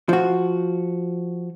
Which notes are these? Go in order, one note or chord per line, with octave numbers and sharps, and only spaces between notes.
F3 F#4